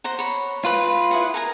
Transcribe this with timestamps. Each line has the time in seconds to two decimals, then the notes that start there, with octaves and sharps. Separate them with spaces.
0.04 C5 F#5 A#5
0.19 C#5 B5
0.65 F4 B4
1.11 E4 G#4 F#5
1.34 A#4 G#5 A#5